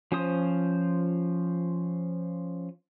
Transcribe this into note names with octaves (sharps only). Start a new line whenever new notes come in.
F3 C#4 F4 C5 D#6